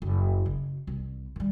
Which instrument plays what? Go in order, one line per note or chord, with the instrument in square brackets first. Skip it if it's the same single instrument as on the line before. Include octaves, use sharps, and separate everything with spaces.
[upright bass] F#1
C#3
C2
D#3 G3